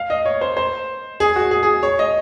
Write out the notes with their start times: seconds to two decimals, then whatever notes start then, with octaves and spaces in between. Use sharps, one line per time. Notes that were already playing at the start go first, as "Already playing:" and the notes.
Already playing: F5
0.10 D#5
0.25 C#5
0.41 C5
0.57 C5
1.20 G#4
1.36 F#4
1.51 G#4
1.63 G#4
1.83 C#5
1.99 D#5